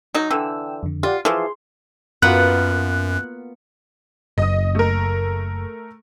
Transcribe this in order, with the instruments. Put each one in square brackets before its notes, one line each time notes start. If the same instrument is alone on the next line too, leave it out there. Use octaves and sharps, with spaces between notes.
[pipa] F#3 D#4
[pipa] D3 E3 [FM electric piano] G5 E6
[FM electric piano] F2 D3
[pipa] F4 [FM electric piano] G4 D5 F#5
[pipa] E3 F3 [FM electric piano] G#4 C6
[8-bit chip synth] F#2 [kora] A#3 F4 F#4 [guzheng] B3 [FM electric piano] F#6
[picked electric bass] F#1 [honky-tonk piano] D#5 D#6
[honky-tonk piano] A3 A#4